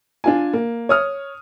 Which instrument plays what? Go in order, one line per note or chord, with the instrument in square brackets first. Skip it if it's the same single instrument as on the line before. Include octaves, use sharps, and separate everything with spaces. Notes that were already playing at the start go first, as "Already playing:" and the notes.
[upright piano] D4 F4 G#5
A#3
C#5 D#6 F6